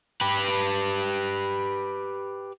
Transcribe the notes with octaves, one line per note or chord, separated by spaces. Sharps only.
G4 B4